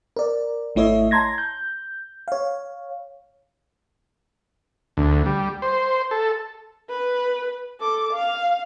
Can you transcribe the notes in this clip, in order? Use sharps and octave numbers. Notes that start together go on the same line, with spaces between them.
A#4 D5
G#1 A3 E4 C#5 D#5 E5
A5 A#5 C6 G#6 A#6
G6
C#5 F5
D2
G3
C5
A4
B4
A4 D6
F5